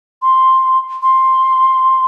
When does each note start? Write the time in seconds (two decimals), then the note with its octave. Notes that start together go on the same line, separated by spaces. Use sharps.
0.22 C6
1.02 C6